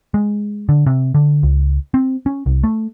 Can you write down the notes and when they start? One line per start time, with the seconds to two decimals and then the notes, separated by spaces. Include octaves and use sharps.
0.14 G#3
0.69 D3
0.86 C3
1.15 D3
1.43 C#2
1.94 C4
2.26 C#4
2.46 C2
2.64 A3